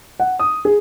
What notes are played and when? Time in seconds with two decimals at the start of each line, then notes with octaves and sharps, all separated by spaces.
0.20 F#5
0.39 D#6
0.65 G#4